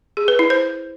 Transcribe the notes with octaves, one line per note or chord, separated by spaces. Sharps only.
G#4
B4
E4
C5